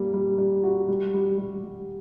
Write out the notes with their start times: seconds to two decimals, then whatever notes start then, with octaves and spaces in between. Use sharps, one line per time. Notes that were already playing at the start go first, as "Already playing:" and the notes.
Already playing: G3 A#3
0.14 G3
0.38 G3
0.64 F#4
0.88 G3
1.14 G3
1.38 G3
1.64 G3